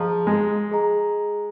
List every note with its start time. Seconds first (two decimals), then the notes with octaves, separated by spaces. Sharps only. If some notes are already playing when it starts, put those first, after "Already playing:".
Already playing: F3 G#4 D#5 A#5
0.27 G#3
0.71 G#4 D#5 A#5